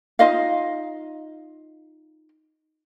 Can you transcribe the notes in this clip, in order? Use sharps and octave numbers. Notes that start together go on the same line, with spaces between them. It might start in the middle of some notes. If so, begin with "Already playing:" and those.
D#4 F4 D#5 F5